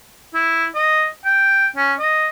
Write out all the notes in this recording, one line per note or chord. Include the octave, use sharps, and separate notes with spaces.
E4
D#5
G5
C#4
D#5